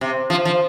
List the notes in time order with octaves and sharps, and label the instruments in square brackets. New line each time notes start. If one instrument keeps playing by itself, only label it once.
[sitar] C3
F3
F3